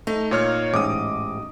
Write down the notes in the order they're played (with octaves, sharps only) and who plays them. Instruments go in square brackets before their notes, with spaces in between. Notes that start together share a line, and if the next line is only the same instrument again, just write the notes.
[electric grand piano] A3 [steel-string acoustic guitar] D#4
[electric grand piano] A#2 C#5 F6
[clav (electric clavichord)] A1 G#2 [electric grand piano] D6 D#6